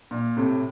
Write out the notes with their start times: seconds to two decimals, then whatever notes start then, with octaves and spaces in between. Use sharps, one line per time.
0.11 A#2
0.37 A2 C3